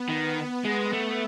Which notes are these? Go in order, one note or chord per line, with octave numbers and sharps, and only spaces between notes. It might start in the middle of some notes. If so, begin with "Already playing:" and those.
Already playing: B3
D#3
G#3
A3